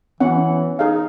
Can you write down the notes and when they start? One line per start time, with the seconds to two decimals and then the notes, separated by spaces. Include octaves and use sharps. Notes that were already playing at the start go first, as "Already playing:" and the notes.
0.20 E3 B3 C#4 F#5
0.79 D#4 G#4 F5